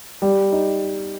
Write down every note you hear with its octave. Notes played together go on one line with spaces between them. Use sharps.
G3
D#4